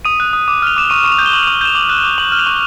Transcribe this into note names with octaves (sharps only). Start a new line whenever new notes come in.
D#6 D#7
F#6
D#6
D6
F6 F7
D6 E7
C#6 D#7
C#6 E7
F7
G6
G7
C#6 F#7
C#6 F7
G6 E7
D6 F#7
F#6
D6
C#6 F#7
F6
F7
C#6